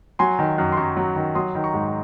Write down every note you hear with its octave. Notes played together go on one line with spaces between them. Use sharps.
F#3 G#5 C6
D#3
F#2
C6
F#2 A#5 C#6
F#3
D#3
F#3 C6 D#6
D#3
A#5 C#6
G#2